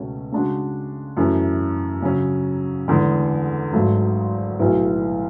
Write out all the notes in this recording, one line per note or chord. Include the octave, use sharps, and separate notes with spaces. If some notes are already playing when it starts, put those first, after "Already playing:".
Already playing: C#2 B2 A3 C#4
C#3 G#3 D4 F#4
F#2 E3 A3 C#4
C#3 F#3 C#4
E2 D3 G#3
G#1 G#2 F#3 A3
B1 A2 F#3 B3 E4